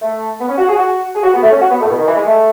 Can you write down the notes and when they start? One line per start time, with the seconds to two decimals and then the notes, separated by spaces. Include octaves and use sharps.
0.02 A3
0.40 B3
0.49 C#4
0.58 F#4
0.68 G#4
0.76 F#4
1.15 G#4
1.23 F#4
1.34 B3
1.43 A3
1.52 C#4
1.62 F#4
1.71 B3
1.81 A3
1.85 A2
1.90 B2
1.98 D#3
2.07 E3
2.17 G#3
2.27 A3